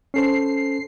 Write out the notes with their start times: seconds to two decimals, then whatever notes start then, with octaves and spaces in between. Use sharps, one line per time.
0.14 C#4 A4 C5 C7